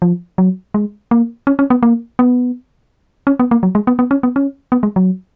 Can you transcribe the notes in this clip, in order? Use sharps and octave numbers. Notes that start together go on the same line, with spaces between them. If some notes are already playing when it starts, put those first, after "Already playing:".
F3
F#3
G#3
A#3
C#4
C#4
B3
A#3
B3
C#4
B3
A#3
F#3
G#3
B3
B3
C#4
B3
C#4
B3
G#3
F#3